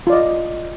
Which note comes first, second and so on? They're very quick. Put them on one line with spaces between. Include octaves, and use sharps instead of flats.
F4 D5 D#5